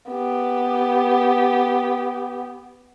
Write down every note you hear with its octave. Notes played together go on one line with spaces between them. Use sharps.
B3 G4